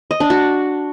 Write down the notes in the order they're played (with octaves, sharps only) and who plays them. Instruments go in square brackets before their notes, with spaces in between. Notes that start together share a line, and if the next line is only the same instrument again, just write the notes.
[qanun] D#5
D4
F#4